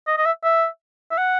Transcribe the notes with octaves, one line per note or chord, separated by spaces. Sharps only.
D#5
D#5
E5
E5
E5
F#5